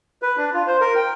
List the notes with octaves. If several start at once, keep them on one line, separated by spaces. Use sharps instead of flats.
B4
D4
F4
C5
A#4
G5